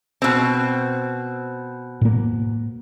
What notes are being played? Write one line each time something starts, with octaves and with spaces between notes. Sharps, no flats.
B2 C4
A2 A#3